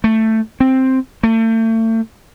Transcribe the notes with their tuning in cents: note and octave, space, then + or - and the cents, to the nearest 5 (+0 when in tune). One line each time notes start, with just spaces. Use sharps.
A3 +10
C4 +5
A3 +35